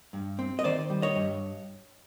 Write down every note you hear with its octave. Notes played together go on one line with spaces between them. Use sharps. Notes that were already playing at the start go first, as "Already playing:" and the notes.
G2
C4
D#5
D#3 C5 D5
G3
C#5 D#5
G2